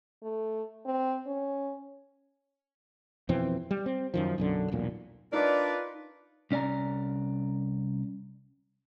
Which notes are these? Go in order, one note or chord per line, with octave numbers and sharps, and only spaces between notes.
A3
C4
C#4
F2 B2 E3 C4
G3
C4
F#2 D#3 F3
B1 F#2 D3
E1 B1 A#2
D4 D#4 F4 A#4 B4 D5
C2 C#4 D5 G#5 A#5